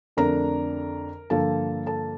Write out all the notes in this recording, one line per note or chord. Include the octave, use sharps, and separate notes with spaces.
F2 D3 A3 D4 A#4 A#5
G2 D3 F3 A#3 A4 A5
A4 A5